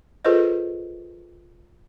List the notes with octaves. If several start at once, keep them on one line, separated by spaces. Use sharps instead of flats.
F4 G#4 A4 B4 C5 D#5